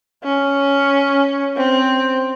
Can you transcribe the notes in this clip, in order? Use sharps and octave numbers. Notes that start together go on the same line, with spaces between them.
C#4
C4